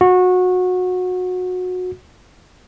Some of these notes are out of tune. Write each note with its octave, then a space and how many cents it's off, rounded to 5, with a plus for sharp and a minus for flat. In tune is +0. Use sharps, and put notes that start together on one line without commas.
F#4 -25